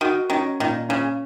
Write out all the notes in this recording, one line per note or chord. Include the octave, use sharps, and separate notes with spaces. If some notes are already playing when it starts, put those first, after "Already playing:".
D#3 F#4
D#3 C#4
A#2 D#3
C#3 C#4